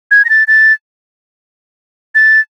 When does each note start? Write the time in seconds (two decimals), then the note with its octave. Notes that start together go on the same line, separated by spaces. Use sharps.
0.11 G#6
0.25 A#6
0.29 A6
0.48 A6
2.15 A6